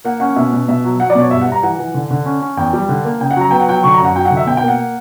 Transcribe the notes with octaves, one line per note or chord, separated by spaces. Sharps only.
A#3 F#5
C#4 F#5
B2 E5
B2
B2 E5
F#3
F#3 F#5
D5
B2
C#5
G2 E5
G2 F#5
A#5
E3 F#5
E3
D3
D3
C#4
C#4
E2 G5
G3
D3
A#3
C#3 G5
F#5
F#3
A#5
B3 G5
F#5
F#3 G5
D3 C#6
A#5
F#2
F#5
F#3 G5
F#5
D3
E5
B2 G5
G5
A#3 F#5